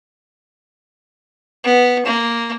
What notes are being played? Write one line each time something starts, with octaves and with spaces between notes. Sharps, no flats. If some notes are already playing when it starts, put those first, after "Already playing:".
B3
A#3